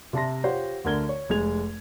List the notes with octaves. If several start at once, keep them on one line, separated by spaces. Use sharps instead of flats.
C3 E5 A5 C6 A#6
F4 G4 C5 C#5 F#5
D2 D3 A#4 G#6 G7
C#5
F1 G#3 G#4 G#6 F7